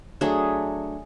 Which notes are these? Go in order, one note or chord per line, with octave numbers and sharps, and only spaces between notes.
F#3 A3 D4 G#4